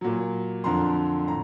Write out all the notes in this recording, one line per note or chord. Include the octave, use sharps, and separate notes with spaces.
A#2 F#3
F2 D3 F3 A#5 C6
A2 A#5